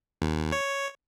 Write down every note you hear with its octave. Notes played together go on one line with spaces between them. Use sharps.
D#2
C#5